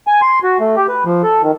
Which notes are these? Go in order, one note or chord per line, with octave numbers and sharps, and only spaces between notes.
G#5
C6
F#4
A3
G4
B4
F3
A4
D#3